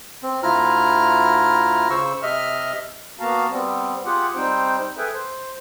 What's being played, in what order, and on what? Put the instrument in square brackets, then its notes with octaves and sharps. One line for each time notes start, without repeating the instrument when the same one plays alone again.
[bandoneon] C4
D2 E4 F4 A#5 F6
C#3 C5 C#6 E6
C3 D#5 E5 F6
[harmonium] A#3 B3 F#4 F5 A5 A#5
G3 B3 C4
F4 G4 G#4 F#5
G3 C4 D#4 C5 G5
G#4 A4 B4 E5 G5 G#5
C5